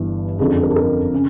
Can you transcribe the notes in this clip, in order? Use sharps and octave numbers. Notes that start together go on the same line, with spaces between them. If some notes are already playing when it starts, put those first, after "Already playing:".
Already playing: G1 G2 E3
F#1 F2 D3 F3 G#4
A4
A#4
A4
A#4
C#3